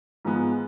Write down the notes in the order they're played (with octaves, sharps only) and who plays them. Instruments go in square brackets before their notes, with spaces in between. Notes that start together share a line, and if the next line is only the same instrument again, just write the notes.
[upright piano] G#2 F3 G#3 B3